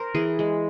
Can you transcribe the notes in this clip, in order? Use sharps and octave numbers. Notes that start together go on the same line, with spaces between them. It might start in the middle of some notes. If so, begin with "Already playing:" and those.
Already playing: A#4 C5
E3 G#4
G#3